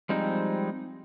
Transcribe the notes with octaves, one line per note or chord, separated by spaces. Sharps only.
F3 G3 G#3 C4 D#4